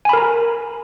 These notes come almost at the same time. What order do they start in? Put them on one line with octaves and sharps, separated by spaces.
G#5 B5 A#4 A#5